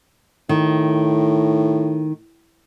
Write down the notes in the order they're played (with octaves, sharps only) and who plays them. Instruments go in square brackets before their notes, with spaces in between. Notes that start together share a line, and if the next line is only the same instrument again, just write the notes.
[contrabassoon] A2 [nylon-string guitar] D#3